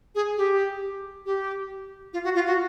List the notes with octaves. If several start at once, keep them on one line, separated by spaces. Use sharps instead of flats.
G#4
G4
G4
F4
F#4
F4
F#4